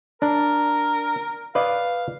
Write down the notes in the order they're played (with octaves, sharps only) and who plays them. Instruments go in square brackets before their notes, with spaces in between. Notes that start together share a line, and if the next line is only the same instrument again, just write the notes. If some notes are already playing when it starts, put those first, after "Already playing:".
[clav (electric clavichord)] D4 [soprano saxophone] A#4
[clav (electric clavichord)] B4 D5 D#5 [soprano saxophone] F5